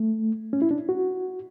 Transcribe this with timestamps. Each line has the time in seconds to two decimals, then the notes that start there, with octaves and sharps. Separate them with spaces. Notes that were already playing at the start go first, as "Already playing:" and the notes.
Already playing: A3
0.53 C#4
0.62 E4
0.71 D4
0.89 F#4